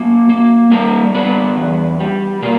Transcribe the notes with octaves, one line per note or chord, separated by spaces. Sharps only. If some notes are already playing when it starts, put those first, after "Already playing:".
Already playing: F#3 A#3
A#3
G3 A#3 A#4
G3 B3 B4
E2
G3
B2 A#3 A#4